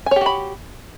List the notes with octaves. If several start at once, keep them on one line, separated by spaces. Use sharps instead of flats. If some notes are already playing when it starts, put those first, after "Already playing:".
F#4 G4 C#5 G#5 B5